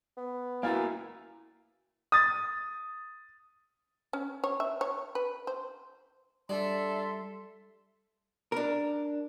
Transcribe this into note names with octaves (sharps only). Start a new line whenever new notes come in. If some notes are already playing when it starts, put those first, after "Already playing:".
B3
A#3 E4 F#4 F5 G#5 A#5 A6
D#6 A6
C#4
C#5
E5
C#5
B4
C5
G3 D4 A4 E5 C6
D4 A#4